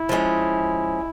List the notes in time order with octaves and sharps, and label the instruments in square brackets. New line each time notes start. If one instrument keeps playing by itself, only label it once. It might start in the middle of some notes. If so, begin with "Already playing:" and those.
Already playing: [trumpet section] E4
[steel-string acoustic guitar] F3 G#3 C#4